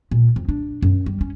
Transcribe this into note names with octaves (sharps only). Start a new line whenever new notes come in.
A#2
F2
D4
F#2
G3
C#4